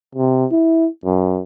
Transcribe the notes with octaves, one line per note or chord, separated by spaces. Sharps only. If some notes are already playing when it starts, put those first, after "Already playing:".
C3
E4
F#2